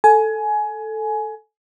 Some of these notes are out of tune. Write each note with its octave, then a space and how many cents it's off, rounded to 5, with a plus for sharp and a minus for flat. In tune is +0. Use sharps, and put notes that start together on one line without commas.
A4 +0 G#5 +20